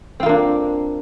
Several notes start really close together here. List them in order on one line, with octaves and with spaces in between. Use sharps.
C4 F4 A#3 D4